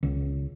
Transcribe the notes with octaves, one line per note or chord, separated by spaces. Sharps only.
C#2